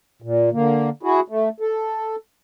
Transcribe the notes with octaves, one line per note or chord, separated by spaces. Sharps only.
A#2
D3 A#3
E4 F#4 G#4
A3
A4